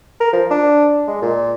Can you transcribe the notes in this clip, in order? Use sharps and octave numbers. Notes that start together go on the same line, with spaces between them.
A#4
F3
D4
G#3
A#2